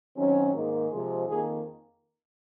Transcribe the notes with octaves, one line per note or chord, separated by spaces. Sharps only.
F#2 D#3 F#3 C4 C#4
G#2 D#3 A#3
C3 F3 G#3
F2 D#3 A#3 G#4